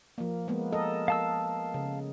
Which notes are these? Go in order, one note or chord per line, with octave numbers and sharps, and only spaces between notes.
F3 A#3
G#3 A#3 B3
A4 A#4 D#5
F5 A5 E6
C#3